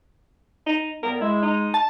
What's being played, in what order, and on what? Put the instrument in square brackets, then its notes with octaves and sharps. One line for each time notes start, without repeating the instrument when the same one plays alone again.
[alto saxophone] D#4
[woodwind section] A2 G3 B3 [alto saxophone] A#4
[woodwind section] G#3 [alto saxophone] E4
[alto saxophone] D#4
[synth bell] A5